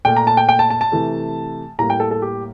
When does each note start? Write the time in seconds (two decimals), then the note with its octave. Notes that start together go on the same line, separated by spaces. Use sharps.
0.05 A#2 A3 G5
0.17 A#5
0.27 A5
0.37 G5
0.49 G5
0.59 A5
0.70 A5
0.81 A5
0.92 C3 E3 A3
1.79 A2 G3 A#3 A#5
1.90 G5
2.00 A4
2.11 A4
2.22 G4